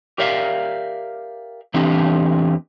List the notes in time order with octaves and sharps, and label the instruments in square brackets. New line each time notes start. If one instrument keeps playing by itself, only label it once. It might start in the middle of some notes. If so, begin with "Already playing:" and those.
[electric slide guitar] G4 A#4 D5 E5 F5
E2 E3 A3 C4 D4 G4